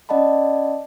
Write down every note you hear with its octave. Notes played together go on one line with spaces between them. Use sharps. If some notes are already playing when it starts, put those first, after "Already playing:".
C#4 D5 D#5 F#5 A5 B5